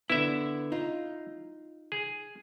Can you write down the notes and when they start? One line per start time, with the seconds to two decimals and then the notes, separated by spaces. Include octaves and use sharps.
0.10 D3 B3 E4 E5
0.72 D#4 F4
1.92 G#4